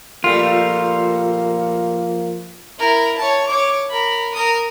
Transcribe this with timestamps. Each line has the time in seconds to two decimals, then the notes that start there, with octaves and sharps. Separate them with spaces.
0.24 A#2 F3 G3 A3 A#3 F4
2.79 E4 A#4
3.18 C#5 A5
3.47 C#5 D6
3.90 A#4 B5
4.34 A#4 D#6